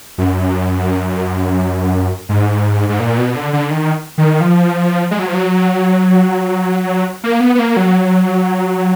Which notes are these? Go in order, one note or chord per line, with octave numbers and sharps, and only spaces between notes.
F#2
G#2
G#2
A#2
B2
D3
D3
D#3
D#3
F3
G#3
F#3
F3
F#3
A#3
B3
B3
A#3
F#3